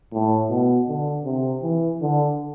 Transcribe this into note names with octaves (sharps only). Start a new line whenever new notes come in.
A2
B2
D3
C3
E3
D3